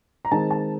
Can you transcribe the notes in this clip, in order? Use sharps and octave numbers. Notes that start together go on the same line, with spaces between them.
A#5
D#3 G#3 C4 D#4 A5
A5